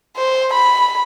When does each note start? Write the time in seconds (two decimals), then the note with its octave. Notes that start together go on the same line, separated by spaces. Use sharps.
0.17 C5
0.53 B5